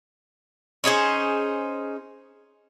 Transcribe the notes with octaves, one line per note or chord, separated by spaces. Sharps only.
C#4 D#4 G#4 C5